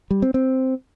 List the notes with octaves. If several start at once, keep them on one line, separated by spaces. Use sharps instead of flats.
G3
C4
C4